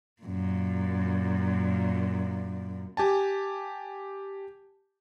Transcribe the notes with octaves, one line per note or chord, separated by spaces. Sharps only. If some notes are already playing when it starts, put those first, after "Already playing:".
F#2 A#2
G4 G#5 A5